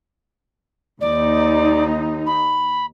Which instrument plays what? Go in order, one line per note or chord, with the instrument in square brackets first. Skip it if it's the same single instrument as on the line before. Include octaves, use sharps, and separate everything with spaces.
[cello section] D#2 D#4 [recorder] D5
[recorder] B5